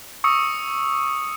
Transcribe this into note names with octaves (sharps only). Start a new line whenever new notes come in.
C#6 D#6 E6 C#7